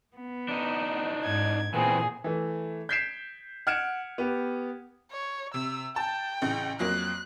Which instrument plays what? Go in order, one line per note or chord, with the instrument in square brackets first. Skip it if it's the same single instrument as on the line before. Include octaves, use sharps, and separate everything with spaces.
[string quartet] B3
[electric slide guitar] D4 D#4
[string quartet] G#2 G#6
[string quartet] A#2 G#4 [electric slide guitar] E3 B3 C4
[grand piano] E3 A3
G6 G#6 B6 C7 D7 E7
F#5 F6 G#6 C#7 D7 E7
B3 G4
[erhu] C#5
[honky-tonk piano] C3 [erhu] E6
[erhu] G5 [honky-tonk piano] A5
[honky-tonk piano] A1 C#3
[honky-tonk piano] F2 F#3 A#3 [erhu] F#6